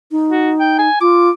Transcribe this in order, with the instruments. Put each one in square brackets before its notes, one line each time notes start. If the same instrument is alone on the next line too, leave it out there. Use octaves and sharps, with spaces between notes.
[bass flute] D#4
[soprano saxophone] F#4
G5
G#5
[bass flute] F4 [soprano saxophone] D6